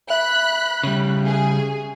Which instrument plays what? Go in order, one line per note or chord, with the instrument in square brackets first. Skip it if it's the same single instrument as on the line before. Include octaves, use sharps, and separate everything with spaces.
[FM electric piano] E5 [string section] B5 F#6
[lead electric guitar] C#3 G3
[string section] G#4